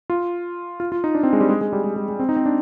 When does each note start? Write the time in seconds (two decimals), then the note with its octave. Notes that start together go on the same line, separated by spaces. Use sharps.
0.10 F4
0.80 F4
0.92 F4
1.04 D#4
1.15 D4
1.23 C4
1.33 G#3
1.41 G3
1.49 G#3
1.61 G#3
1.73 G3
1.84 G#3
1.96 G#3
2.08 G#3
2.19 C4
2.29 D#4
2.36 C4
2.46 D4